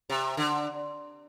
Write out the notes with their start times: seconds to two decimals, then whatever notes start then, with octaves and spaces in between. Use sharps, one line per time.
0.10 C3
0.37 D3